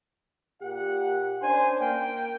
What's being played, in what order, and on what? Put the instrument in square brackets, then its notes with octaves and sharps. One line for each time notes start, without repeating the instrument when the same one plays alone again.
[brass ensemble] A#2 G4 F#5
[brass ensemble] C#4 D4 C5 [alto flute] G#5
[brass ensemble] A#3 [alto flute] G5